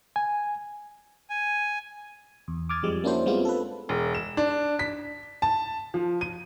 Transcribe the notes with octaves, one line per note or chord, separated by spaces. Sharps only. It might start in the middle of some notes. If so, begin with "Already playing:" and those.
G#5
G#5
E2
D6 D#6 F6 G#6 A6
F2 F3 G3 G#3
A#3 C#4 D4 E4 F#4 C5
G3 G#3 B3 C4 F4
A4 B4
E1
E7
D4
B6
A5
F3
D#7